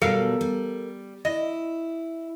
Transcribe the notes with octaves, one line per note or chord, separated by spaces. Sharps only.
B2 F#3 G3 A4 A#4 F5
G3
E4 D#5